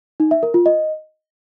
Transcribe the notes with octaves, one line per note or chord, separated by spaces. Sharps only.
D#4
E5
A#4
F4
D#5